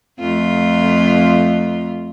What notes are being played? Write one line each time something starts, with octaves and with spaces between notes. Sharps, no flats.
F2 A3 F4